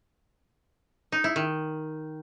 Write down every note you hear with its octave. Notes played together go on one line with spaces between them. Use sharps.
D#4
E4
D#3